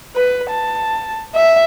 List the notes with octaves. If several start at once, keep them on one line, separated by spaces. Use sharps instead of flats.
B4
A5
E5